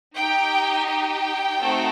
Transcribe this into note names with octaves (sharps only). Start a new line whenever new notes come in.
D#4 G4 G5
G5
A3 C4 D#4 F#4 A4